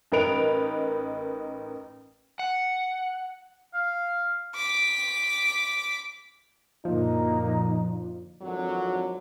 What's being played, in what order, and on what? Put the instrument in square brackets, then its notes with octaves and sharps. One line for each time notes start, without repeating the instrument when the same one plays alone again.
[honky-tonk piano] A1 D#4 A#4 B4 D7 F7
[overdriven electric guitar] F#5
[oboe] F5
[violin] D6 B6
[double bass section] F#2 A#2 D3 [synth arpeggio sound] F3 [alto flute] A#3 [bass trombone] D#4
[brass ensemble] G#1 F2 D3 F#3